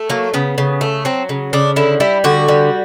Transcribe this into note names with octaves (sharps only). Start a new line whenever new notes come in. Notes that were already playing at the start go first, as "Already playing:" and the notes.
Already playing: A3
F#3 A#3
C#3 B3
C#3
A3
F#3 C4
C#3
C#3 D4
D3 E4
G3 E4
D3 F#4
G3